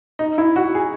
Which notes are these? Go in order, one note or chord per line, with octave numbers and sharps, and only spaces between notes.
D#4
E4
F#4
G#4